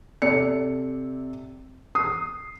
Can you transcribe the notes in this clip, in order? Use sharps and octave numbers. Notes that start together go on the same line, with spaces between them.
C3 A4 D5 C#7
D#6 C7